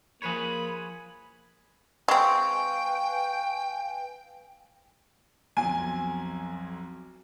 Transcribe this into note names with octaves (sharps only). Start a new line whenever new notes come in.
F3 A#3 G#4 B4 C#5 B5
G#3 C4 B4 F5 G5 G#5 C#6
B1 F2 G#5